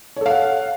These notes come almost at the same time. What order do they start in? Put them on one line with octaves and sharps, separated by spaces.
C#5 A4 F5 F#5